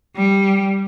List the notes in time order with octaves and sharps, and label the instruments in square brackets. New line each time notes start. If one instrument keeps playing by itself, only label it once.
[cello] G3